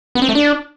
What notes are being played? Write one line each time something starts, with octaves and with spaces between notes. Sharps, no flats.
B3
C4
A3
D4